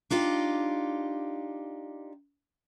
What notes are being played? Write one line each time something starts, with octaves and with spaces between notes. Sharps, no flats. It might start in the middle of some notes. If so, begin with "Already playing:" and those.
D4 D#4 F4 G4